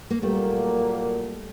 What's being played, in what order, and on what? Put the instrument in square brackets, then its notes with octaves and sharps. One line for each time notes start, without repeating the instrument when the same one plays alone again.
[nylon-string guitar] A#3
[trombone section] A#2 F#3 A#3 [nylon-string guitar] G3 A3